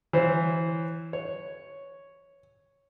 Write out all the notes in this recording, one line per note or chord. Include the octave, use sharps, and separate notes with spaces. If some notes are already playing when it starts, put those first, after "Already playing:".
E3 C5 C#5
C#5